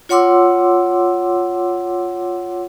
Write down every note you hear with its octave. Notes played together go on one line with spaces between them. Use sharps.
F4 C#5 F#5 C6 D6 E6